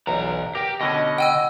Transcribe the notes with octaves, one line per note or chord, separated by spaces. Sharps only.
B1 E2 B4 A#5
G4 A#4 G5
B2 D3 C#4 D#5
F#5 G5 E6